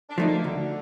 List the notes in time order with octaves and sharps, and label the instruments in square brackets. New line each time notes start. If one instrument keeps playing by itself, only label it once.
[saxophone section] D4
[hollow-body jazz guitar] F3 A3 D#4
[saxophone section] A#3
[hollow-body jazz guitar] D2 [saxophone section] D3